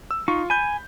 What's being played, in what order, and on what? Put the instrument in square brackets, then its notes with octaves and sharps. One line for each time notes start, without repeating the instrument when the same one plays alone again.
[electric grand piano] E6
[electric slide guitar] D#4 [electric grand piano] F4 C#6
[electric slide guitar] G#5 [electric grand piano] B5 G6